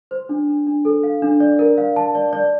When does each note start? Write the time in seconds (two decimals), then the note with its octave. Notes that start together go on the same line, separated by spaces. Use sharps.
0.11 C5
0.29 D4
0.48 D4
0.67 D4
0.85 A4
1.03 F5
1.22 D4
1.40 D5
1.59 A#4
1.78 F5
1.96 A5
2.15 D5
2.33 D5